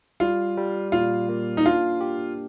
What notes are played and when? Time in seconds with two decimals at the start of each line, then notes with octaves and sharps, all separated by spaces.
0.20 G3 F4
0.57 G3
0.92 A#2 F4
1.29 A#3
1.57 D#4
1.66 D4 F4
2.01 G4